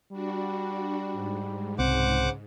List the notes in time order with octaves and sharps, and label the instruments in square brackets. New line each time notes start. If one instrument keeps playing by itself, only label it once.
[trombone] G3 [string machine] D4 F#4
[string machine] G#2
[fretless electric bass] C2 C4 [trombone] C#3 [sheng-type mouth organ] C5 F#5 D6